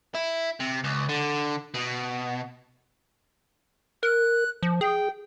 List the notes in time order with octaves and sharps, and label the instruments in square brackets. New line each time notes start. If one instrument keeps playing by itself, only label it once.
[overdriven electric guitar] E4
C3
C#2
D3
B2
[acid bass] A#4 [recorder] F#6
[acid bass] F3
[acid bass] G#4 [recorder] G5